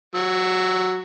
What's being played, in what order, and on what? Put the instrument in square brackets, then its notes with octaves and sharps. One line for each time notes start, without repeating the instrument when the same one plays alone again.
[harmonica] F#3 E6